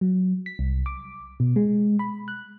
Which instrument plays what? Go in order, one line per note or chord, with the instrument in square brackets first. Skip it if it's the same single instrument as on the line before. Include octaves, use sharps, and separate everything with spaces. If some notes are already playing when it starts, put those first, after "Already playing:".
[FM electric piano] F#3
B6
C2
D6
B2
G#3
B5
F#6